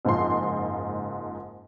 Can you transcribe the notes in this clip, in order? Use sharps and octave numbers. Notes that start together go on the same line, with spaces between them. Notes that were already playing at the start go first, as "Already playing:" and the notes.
F#1 G#2 F3 C6